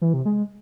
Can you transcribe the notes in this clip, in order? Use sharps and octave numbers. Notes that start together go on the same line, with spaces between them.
E3
C3
G#3